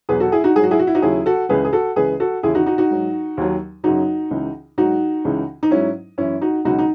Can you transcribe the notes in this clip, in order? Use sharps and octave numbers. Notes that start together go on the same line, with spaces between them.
E2 B2 F#3 G#4 B4
F#4 A4
E4 G#4
D#4 F#4
G#2 F#3 F#4 G#4
E4 G#4
F#4
E4
D#4 F#4
D#2 C#3 F#3 E4 G#4
F#4 A4
C#2 C#3 E3 G#4 B4
G#4
F#4 A4
C#2 C#3 E3 G#4 B4
F#4 A4
D#2 C#3 E3 E4 G#4
D#4 F#4
D#4 F#4
D#4 F#4
G#2 F#3
D#2 D#3 F#3
F#2 C#3 F#3 D#4 F#4
C#2 C#3 E3
G#2 F#3 D#4 F#4
C#2 C#3 E3
D#4
G#2 F#3 C#4 E4
F#2 E3 C#4 E4
D#4 F#4
C#2 B2 F#3 D#4 F#4
D#4